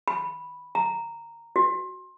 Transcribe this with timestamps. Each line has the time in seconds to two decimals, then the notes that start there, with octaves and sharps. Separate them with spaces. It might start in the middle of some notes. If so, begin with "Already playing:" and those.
0.08 B5
0.75 A#5
1.56 F#4